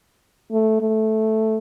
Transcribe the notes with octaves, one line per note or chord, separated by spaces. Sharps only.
A3
A3